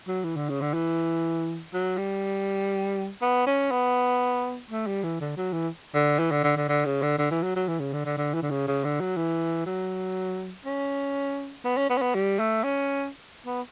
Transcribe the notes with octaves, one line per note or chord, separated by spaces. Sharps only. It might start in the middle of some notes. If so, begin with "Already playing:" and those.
F#3
E3
D3
C#3
D3
E3
F#3
G3
B3
C#4
B3
A3
G3
E3
D3
F#3
E3
D3
E3
D3
D3
D3
D3
C#3
D3
D3
E3
F#3
F#3
E3
C#3
D3
D3
D3
E3
D3
C#3
C#3
D3
F#3
E3
F#3
C#4
B3
C#4
B3
C#4
B3
G3
A3
C#4
B3